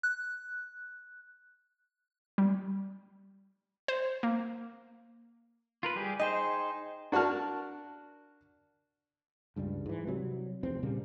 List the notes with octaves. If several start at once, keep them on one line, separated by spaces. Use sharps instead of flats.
F#6
G3
C5
A#3
F4 A#4 B4
G3 G4 G#4
D#4 G#4 C5 D#5 G5
D4 F#4 A#4 A5 F6
C#2 G2 C#3 G3
G#2 E3
C3 F#3 G3
F1 E2 C4
A#2 C#3 G3 A#3